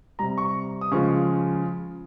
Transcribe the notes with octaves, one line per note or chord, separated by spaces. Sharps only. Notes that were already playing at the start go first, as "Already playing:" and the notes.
C3 G3 A#5
C#6
D#6
C#3 F3 G#3 C#6